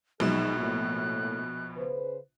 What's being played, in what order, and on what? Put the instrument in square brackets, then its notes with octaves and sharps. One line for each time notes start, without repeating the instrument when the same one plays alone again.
[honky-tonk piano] A#1 B2 [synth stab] F#3 G#3 E7 [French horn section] D#4 G#4 [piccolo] F#6
[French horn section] A2 A3 A#3
C#3 B4 C5